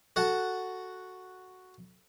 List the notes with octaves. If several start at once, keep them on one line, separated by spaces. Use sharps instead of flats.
F#4 A4 F#5 A5